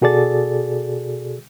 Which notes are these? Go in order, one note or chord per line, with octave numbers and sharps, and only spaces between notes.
B2 F#4 G#4 A4 D5 A6